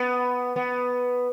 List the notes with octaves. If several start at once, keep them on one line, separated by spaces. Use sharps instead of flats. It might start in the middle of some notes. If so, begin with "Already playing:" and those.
Already playing: B3
B3